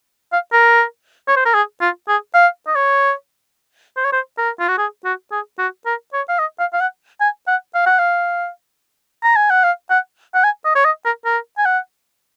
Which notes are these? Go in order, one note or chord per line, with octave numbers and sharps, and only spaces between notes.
F5
A#4
C#5
C5
A#4
G#4
F4
G#4
F5
D#5
C#5
C5
C#5
C5
A#4
F4
F#4
G#4
F#4
G#4
F#4
A#4
C#5
F5
D#5
F5
F5
F#5
G#5
F#5
F5
F#5
F5
A#5
G#5
F#5
F5
F#5
F#5
G#5
D#5
C#5
D#5
A#4
A#4
G#5
F#5